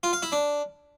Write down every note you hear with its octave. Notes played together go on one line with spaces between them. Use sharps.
F4
F5
E4
D4